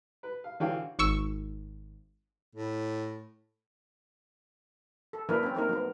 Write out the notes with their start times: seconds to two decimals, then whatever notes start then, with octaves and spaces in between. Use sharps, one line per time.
0.23 B4
0.44 F5
0.60 D3 E3 F#4 C#5 F5 G5
0.99 G#1 C#6 E6
2.55 A2
5.13 A4
5.29 F#3 A#3 D4 E4 A#4 B4
5.43 C4 C#4
5.55 A3 A#3 D#4 A#4
5.69 F#3 B3